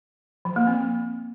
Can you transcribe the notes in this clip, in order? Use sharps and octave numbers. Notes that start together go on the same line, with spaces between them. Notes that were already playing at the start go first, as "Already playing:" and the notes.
F3
A#3
C4